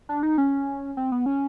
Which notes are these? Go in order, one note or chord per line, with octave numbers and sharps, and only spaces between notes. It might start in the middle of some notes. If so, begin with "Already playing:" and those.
D4
D#4
C#4
C4
B3
C#4